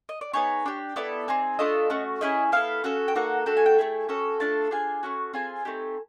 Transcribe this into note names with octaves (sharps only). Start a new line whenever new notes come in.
D#5
D5
B3 D#4 G#4 C#5
D4 G4
B3 E4 A4 D5
C4 D#4 G#4
A3 D4 F4 A4 D#5
A3 C#4 F#4
C#4 E4 G#4 D#5
B3 E4 A4 F5
C#4 F#4 A4
G5
A#3 D#4 F#4 A4 F#5
A3 D4 F#4 A4 G5
G#5
G5
A3 C4 E4 G#4
C#4 F#4 A4
A3 D4 F4 A4 A5
D4 F4 G#4 G#5
A3 C#4 F#4
C4 F4 G#4 G#5
A3 C4 D#4 G4